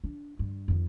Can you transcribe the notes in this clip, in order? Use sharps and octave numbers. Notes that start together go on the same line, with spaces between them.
D4
G2
F2 D#3